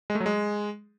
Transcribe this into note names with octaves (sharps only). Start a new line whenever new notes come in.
G#3
A3
F#3
G#3